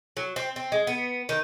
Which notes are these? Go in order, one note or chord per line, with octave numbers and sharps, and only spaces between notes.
F#3
C4
C4
G#3
B3
D#3